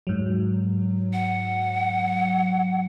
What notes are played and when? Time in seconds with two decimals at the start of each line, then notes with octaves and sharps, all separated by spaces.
0.07 G#2 F#3
1.13 F#5